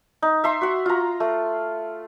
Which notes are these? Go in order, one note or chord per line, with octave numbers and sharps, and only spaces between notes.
D#4
E5 A#5 C6
F#4 F#5
F4 A#5
A3